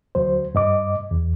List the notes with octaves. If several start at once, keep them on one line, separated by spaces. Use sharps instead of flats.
D2 F#3 C5
G2 D#5 D6
E2